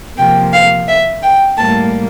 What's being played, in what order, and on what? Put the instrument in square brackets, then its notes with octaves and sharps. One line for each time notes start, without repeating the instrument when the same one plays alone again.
[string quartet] C3 F3 A#3 G5
F5
E5
G5
A2 G3 A#3 A5